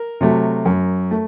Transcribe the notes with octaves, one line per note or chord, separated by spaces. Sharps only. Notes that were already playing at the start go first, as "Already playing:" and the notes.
Already playing: A#4
C3 F#3 A3
F#2
A3